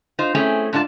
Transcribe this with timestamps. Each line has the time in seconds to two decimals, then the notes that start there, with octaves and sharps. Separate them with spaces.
0.19 D#4 F4 C5
0.35 A3 C4 C#4 E4 G#4
0.73 G#2 D4 F4 A4 A5